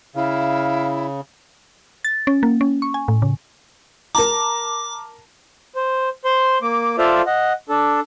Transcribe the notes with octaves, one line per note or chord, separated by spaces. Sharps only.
C#3 E4 F5
A6
C#4
A#3
C#4
C#6
G#5
A2
C#3
A#4 A5 A#5 D6
C5
C5 C6
A#3 D6
F4 A4 C5 D5 E5 F5
D#5 F#5
D4 A4